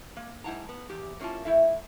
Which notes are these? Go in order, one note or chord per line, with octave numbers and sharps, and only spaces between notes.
A#3
G#2 E4 F#5 A5 A#5
B3
E2 G4
A#3 C#4 E4 F4 A5
A3 E4 A4 E5